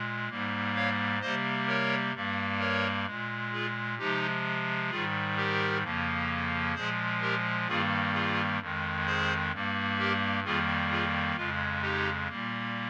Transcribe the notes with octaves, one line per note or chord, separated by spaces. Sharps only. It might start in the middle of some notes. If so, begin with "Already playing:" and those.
Already playing: A#2 G#3
G#2 G3 A#3
C#5 F5
C3 G3 A#3 C5 D#5
A#4 C#5
G2 G3 A#3
A#4 C#5
A#2 G#3
F4 G#4
C3 F3 G#3 D#4 G4
G#2 D#3 G3 F4 G#4
G4 A#4
F2 C#3 F3 A#3
A#2 F3 G#3 G#4 C5
G4 A#4
G2 D#3 G3 A#3 F4 G#4
F4 G#4
F2 D#3 G#3
G#4 C5
G2 G3 A#3
G4 A#4
F2 D#3 G3 A#3 F4 G#4
F4 G#4
F2 C#3 G#3 F4
D#4 G4
A#2 G3 A#3